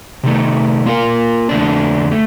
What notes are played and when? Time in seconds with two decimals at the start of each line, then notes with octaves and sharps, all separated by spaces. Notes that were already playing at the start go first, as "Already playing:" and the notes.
0.24 C3 D#3 A3
0.86 A#3 F4 A#4 F5
1.49 F2 D3 A3 D4
2.11 A3